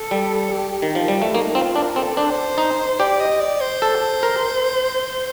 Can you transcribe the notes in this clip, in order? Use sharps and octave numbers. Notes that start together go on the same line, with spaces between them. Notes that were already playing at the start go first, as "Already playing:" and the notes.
Already playing: A4
G3
G4
G4
D#3
F3 D#4
G3
A3
F4
A#3 D#4
C4 F4
D4 A#4
C4 A4
D4 C5
D#4
G4 D5
D#5
D5
C5
A4
A#4